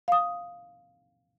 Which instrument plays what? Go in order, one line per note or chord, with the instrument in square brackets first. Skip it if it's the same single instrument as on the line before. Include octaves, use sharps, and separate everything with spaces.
[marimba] F5 D#6